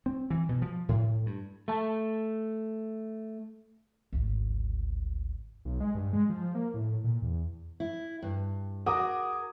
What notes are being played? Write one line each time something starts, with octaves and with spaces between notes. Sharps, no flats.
C4
E3
B2
F3
A2
G2
A3 A5
G#1 D2
B1
G#3
G2
G#3
F3
A#3
A2
A#2
E2
E4
G2
F#4 G#4 A#4 D6 D#6